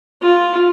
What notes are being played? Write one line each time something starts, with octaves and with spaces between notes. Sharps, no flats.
F4